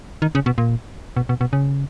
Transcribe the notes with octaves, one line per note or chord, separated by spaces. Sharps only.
D#3
C#3
B2
A#2
B2
B2
B2
C#3